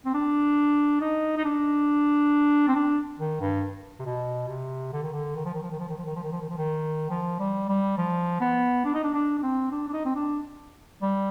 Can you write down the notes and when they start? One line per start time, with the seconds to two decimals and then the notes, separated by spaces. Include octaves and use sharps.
0.05 C4
0.14 D4
1.01 D#4
1.37 D#4
1.44 D4
2.68 C4
2.75 D4
3.19 D#3
3.40 G2
3.99 C3
4.06 B2
4.49 C3
4.93 D3
5.03 D#3
5.13 D3
5.36 D#3
5.45 F3
5.54 D#3
5.62 F3
5.71 D#3
5.80 F3
5.89 D#3
5.98 F3
6.06 D#3
6.15 F3
6.23 D#3
6.32 F3
6.41 D#3
6.50 F3
6.58 D#3
7.10 F3
7.39 G3
7.69 G3
7.98 F3
8.41 B3
8.85 D4
8.94 D#4
9.03 D4
9.14 D4
9.38 D4
9.43 C4
9.72 D4
9.88 D4
9.93 D#4
10.05 C4
10.16 D4
11.02 G3